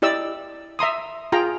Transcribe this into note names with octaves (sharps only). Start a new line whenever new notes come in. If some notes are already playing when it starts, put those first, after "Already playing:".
E4 G4 D5 D#5 E6
E5 A#5 C6 D#6
F4 G#4 G5 A#5